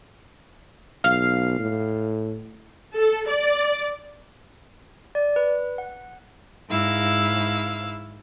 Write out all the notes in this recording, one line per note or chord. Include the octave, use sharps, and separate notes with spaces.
B1 F5
A2
A4
D5
D5
B4
F#5
G#2 E4 F5 E6